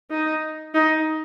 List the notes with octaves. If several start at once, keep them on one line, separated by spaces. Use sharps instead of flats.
D#4
D#4